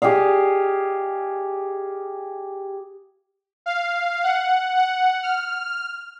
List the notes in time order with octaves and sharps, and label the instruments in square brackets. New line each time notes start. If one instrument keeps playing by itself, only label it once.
[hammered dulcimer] G4 G#4 D#5 F5
[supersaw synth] F5
F#5
F#5
F6